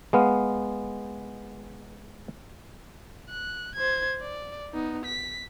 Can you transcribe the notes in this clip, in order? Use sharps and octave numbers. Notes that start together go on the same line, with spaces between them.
G#3 B3 F5
F#6
C5 G#6
D5
B3 D#4
B6